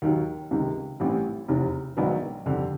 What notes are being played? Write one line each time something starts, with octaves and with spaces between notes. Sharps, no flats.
D#2 D#3 F#3
C#2 C3 D#3
A1 A2 E3 G3 C4
F1 E2 C3
A#1 G#2 D#3 F#3 B3
F2 D3 G3 C4